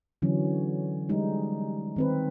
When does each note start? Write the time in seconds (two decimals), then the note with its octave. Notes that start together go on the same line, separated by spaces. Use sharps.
0.22 D3 E3 F#3 C#4
1.09 G3 G#3 D#4
1.96 D#3 C4 B4